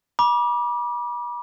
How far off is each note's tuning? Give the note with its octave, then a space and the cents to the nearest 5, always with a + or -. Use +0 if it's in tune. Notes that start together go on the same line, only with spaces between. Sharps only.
B5 -40 D6 +0